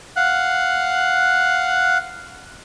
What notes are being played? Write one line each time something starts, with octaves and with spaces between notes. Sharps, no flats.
F5 F#5 F#6